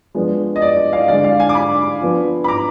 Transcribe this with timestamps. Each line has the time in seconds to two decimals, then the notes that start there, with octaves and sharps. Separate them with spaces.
0.15 F3 G#3 B3 D4
0.56 D#5
0.62 D5
0.77 D#5
0.93 D5 F5
1.08 D3 G#3 D4 D5 F5
1.24 D5 F5
1.40 F5 G#5
1.49 D6
1.55 G#5 B5
2.02 F3 B3 D4
2.44 B5
2.48 A#5 D6